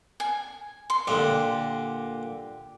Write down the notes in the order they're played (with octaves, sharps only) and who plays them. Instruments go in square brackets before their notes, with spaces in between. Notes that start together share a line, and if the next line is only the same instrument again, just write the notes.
[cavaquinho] G#5
C6
[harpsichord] A#2 D3 [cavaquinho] G4